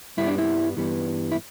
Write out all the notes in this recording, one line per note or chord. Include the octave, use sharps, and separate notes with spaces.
G2 G3 B3 E4
D4
E4
G2 E3 G3 B3
E4